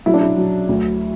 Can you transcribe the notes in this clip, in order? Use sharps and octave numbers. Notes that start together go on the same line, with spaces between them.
F#3 E4
D4
E4
F#3
D2